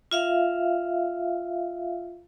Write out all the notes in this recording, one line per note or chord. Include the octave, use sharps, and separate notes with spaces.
F4 E5 F5